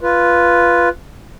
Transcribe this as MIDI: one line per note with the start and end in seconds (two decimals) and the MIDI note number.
0.01 0.89 65
0.01 0.89 71